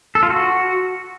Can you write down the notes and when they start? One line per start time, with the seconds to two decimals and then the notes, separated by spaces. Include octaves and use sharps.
0.15 A4
0.23 F4
0.30 F#4